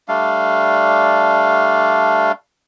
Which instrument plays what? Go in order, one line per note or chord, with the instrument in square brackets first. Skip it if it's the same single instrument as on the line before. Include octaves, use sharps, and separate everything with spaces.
[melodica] G3 A3 D4 F5